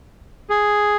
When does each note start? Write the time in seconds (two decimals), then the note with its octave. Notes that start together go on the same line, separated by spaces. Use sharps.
0.50 G#4